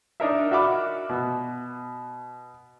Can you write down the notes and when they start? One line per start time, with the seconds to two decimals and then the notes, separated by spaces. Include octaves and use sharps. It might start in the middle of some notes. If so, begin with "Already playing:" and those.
0.20 D4 D#4 A#4 E5
0.51 F#4 E5 F#5 B5 D6 F6
1.09 B2